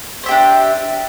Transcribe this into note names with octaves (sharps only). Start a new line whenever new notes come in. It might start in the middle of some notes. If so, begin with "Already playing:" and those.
D4 G4 C5 E5